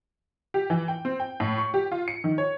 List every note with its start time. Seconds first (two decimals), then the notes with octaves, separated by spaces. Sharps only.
0.54 G4
0.70 E3
0.88 G5
1.05 C4
1.20 G5
1.40 A2
1.58 C#6
1.74 G4
1.92 F4
2.08 C#7
2.24 D#3
2.38 C#5